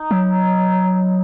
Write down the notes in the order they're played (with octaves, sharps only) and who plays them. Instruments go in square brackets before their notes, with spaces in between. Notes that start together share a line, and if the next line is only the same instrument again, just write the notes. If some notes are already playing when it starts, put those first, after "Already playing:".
Already playing: [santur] D#4
[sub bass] F#3